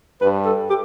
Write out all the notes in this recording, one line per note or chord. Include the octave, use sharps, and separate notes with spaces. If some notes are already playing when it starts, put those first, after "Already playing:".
G2 B4
A4
G4